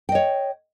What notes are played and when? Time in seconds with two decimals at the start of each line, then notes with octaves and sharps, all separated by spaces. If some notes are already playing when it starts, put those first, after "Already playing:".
0.09 G5
0.12 D#5
0.15 C#5